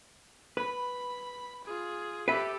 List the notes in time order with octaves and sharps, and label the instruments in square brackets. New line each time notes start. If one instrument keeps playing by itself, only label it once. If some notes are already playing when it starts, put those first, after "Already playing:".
[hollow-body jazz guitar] B4 [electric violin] B5
[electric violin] F4 G#4
[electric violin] G4 A4 [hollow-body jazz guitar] B4 E5